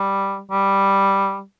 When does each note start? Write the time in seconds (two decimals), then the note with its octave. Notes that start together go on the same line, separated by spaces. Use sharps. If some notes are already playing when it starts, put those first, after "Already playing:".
Already playing: G3
0.51 G3